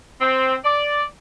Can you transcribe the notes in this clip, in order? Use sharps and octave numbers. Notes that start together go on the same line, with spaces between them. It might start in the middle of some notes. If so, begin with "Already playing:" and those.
C4
D5